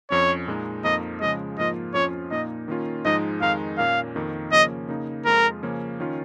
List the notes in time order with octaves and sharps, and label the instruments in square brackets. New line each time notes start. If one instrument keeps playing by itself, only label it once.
[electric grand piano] F2 F3 C#4 [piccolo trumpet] C#5
[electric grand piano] A#2 G#3 D#4
[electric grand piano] F2 F3 A#3 D#4 [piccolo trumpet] D#5
[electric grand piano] C#3 F3 G#3 [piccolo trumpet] D#5
[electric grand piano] G#2 F3 A#3 F4 [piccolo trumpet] D#5
[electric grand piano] F2 F3 C#4 F4 [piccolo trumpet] C#5
[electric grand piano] A#2 A#3 D#4 [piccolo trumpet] D#5
[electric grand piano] D#3 A#3 C#4 F4
[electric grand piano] G#2 F3 G#3 D#4 [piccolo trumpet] D#5
[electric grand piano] F2 D#3 G#3 D#4 [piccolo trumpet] F5
[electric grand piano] A#2 A#3 C#4 [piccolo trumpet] F5
[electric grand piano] F2 D#3 A#3
[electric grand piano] C#3 F3 A#3 C#4 [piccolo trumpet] D#5
[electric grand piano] C#3 A#3 D#4
[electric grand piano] F2 F3 G#3 F4 [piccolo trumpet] A#4
[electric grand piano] C#3 F3 A#3 C#4
D#3 C#4 F4